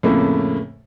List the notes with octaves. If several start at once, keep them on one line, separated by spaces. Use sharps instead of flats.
F2 A2 C#3 A3 A#3